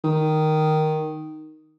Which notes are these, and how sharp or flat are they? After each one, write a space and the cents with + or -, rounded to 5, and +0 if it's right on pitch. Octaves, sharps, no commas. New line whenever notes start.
D#3 +0